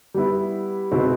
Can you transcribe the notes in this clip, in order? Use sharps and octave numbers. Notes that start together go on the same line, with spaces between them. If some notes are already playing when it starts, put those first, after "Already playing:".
G3 B3 E4
B2 G#3 C4 E4